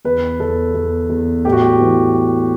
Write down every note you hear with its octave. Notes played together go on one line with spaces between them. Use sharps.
E2 B4
E2 A4
E2
E2
A2 G4
F#4
G4
E3